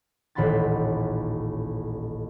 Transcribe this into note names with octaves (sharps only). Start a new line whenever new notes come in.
D#1 A1 F#5 B5 C6 A6